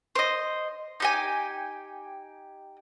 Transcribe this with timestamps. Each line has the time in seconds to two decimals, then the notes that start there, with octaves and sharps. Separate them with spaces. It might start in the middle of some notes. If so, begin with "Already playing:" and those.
0.15 C5 D#5
1.00 D#4 G4 G#5